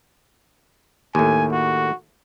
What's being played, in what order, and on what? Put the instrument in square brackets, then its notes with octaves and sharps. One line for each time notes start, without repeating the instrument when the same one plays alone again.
[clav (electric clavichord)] D#2 A2 [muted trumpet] G#5
[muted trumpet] F#4